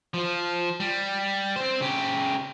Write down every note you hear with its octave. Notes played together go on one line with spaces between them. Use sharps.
F3 F4
G3
C4 C5
C#3 G4